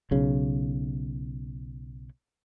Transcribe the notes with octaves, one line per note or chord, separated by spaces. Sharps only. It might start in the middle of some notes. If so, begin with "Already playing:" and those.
B1 C#3